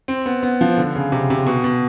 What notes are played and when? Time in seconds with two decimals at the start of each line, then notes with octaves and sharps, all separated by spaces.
0.08 C4
0.26 B3
0.43 B3
0.61 F3
0.77 D3
0.95 C#3
1.12 C3
1.30 C3
1.47 B2
1.64 B2